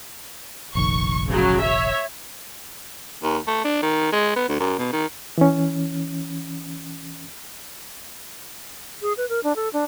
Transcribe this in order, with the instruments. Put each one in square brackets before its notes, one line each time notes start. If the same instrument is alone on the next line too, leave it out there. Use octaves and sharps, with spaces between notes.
[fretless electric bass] F1 A#1 D#3 [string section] C#6
[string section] C#3 F#3
C#5 E5
[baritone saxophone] D#2
A3
D4
D#3
G#3
B3
D2
F#2
B2
D#3
[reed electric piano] E3 C#4
[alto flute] G#4
B4
A#4
D4
A4
D4